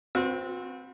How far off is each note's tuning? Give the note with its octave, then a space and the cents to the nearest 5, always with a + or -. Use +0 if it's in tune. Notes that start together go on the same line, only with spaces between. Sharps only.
C4 +0 F#4 -40 B4 +0